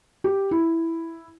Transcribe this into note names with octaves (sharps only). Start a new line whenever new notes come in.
G4
E4